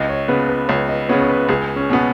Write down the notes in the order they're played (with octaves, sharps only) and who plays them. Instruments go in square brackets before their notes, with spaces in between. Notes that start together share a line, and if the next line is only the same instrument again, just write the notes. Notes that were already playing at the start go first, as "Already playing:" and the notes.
Already playing: [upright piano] C#2 [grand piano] D#5
[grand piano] C#5
[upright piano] C#3 B3 [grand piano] B4
[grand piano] B4
[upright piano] C#2 [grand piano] C#5
[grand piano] D#5
[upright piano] C#3 B3 [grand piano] C#5
[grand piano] C#5
B4
[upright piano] C#2 [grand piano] G#4
[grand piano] C#4
[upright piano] B2 B3